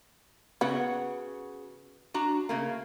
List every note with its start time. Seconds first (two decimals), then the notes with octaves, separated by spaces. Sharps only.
0.61 C#3 B3 F#4 F#5
2.14 D4 F#4 A#5
2.49 C#3 A3 A#3